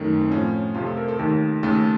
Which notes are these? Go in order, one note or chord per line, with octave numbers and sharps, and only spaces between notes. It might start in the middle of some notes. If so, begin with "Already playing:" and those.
Already playing: F#2 D#3 A3
C4
A2 F3 A3 C#4
F2 C3 F3 A3 F4
A4
A#4
A4
D#2 D#3 A3 A#4
D#2 C#3 A3 A4